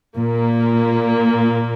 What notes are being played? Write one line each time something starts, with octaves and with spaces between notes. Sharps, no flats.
A#2 A#3